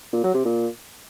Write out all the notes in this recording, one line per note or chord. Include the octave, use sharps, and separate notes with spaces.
A#2
F#3
C3
A#2